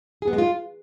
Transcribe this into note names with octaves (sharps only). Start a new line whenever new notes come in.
G#4
B3
G#3
F4